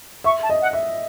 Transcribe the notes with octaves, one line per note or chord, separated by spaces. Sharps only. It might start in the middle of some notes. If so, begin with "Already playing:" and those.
E5 C#6
A5
D#5
F#5
E5